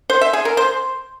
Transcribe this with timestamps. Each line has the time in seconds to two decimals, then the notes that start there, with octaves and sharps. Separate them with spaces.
0.10 C5
0.21 E5
0.33 G#4
0.45 A#4
0.57 C5